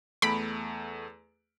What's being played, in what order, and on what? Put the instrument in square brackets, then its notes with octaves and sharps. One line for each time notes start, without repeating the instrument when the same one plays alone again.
[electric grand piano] E2 A3 D7 [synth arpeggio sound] B5